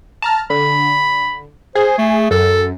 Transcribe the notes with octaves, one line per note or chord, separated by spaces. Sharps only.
A5 A#5 F6
D3 B5
G#4 C5
A3
F#2 A4